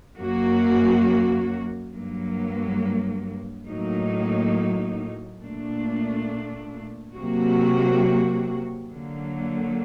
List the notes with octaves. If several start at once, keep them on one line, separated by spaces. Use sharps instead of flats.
F#2 F#3 A#3 F#4
G2 F#3 A#3
A2 F#3 A#3 D#4
A#2 A3 D4
C3 F#3 A#3 F#4
D3 F#3 A#3